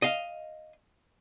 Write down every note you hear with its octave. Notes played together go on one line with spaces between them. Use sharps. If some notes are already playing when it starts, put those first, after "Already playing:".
D#5 F5